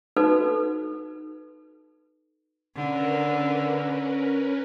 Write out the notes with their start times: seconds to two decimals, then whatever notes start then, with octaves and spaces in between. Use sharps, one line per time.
0.16 D#4 F#4 A4 B4
2.75 D3 C#4 A#4 B4